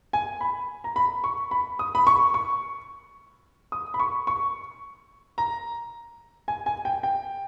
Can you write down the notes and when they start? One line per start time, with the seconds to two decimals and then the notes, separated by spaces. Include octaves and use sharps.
0.13 G#5
0.41 B5
0.84 A#5
0.96 B5
1.24 C#6
1.51 B5
1.79 D#6
1.95 B5
2.07 C#6
2.34 C#6
3.72 D#6
3.94 B5
4.00 C#6
4.27 C#6
5.38 A#5
6.48 G#5
6.66 G#5
6.85 G5
7.03 G5